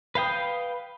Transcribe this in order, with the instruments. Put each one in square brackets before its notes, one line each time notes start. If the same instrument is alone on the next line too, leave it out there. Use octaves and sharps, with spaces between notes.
[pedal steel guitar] B4 F5 G5 D#6